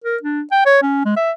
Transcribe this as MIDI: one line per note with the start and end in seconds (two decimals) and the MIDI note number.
0.04 0.17 70
0.23 0.42 62
0.52 0.64 79
0.66 0.81 73
0.82 1.02 61
1.05 1.13 56
1.17 1.32 76